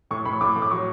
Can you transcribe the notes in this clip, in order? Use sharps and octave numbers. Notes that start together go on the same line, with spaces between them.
A2 C#6
A2 B5
C#6
A2 D6
A2
D6
F#3 C#6